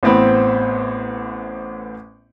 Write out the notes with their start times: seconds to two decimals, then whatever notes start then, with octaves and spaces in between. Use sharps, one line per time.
0.03 A1 A2 B3 C4 C5 B5